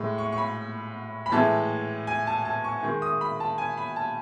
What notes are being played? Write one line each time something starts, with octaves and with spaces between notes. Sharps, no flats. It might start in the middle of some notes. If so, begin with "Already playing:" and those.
Already playing: A2 G#3
C#6
C#6
B5
B5
A2 E3 G#3 A5
G#5
A5
A5
C#6
D#3 G#3 C#6
D#6
B5
A5
G#5
B5
A5